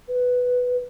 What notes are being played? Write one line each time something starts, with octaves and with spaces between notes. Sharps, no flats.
B4